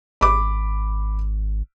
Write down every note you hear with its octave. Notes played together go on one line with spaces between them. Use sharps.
G#1 B5 D6